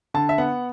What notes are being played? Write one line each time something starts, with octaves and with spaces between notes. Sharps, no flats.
D3 A5
E5
B3 F#5